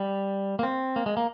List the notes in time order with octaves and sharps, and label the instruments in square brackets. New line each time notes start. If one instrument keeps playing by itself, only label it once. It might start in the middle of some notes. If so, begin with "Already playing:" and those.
Already playing: [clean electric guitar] G3
A#3
C4
A#3
G#3
A#3